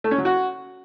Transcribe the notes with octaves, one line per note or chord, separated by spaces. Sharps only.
A3
C#4
F#3
F#4